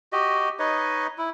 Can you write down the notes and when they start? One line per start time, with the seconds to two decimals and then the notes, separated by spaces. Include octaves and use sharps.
0.12 F#4 G4 D#5
0.59 D#4 B4 C#5 D#5
1.18 E4